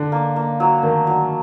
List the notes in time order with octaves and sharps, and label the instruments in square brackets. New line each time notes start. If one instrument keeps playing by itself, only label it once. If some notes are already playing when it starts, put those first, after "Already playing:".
Already playing: [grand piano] D3
[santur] A#3
A#3
F#3
[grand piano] D#3 [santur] D4
[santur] F#3